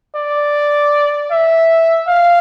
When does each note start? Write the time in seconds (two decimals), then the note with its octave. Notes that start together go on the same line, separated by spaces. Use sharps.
0.15 D5
1.31 E5
2.08 F5